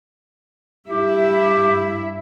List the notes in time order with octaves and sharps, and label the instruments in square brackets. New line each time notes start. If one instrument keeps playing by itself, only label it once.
[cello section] G2 E4 E5 [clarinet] G4